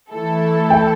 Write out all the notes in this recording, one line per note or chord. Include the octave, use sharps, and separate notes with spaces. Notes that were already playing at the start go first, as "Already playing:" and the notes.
E3 A3 E4 A4
G5